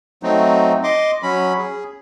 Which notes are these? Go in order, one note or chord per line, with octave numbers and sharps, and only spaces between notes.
F#3 A3 C4 D#4
D#5 C6 D6
F#3 C#4 B5
G#4